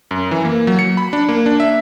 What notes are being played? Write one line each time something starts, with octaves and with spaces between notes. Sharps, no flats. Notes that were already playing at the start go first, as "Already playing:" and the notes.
F#2
E3
A#3
F#3
C#7
B5
D4
A#3
D4
E5